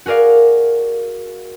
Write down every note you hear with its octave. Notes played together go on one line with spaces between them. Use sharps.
F#4 G#4 A#4 D5 F5